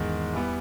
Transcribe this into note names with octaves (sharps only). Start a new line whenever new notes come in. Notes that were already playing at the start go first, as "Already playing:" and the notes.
Already playing: E2 G#2 D#3 G#3
E3 G3 B3